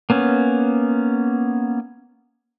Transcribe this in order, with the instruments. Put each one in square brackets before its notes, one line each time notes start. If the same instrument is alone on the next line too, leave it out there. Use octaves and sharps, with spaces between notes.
[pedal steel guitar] A#3 B3 C#4